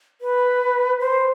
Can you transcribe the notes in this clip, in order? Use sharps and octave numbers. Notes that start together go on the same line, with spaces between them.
B4
C5